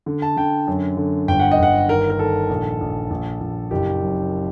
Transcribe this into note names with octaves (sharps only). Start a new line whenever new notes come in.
D3
A5
D3 G5
F#2
D3
G1 G5
F#5
D#5
G1 F#5
D#3 A#4
A#4
D#3 A4
A#1
A#1
A#1
A#1
F#1 G4
F#2